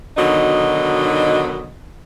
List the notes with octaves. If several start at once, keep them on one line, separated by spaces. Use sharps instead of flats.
B2 D3 D#3 F#3 D#4 D#5